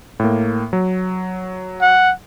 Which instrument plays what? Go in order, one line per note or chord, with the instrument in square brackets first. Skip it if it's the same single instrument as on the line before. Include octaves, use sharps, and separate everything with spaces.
[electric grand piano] A2 A#3
F#3
[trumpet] F#5